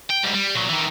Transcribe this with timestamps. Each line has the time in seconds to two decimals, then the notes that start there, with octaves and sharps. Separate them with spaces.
0.10 G5
0.24 G#2 G3
0.35 G3
0.55 A#2 F#3
0.70 D#3 E3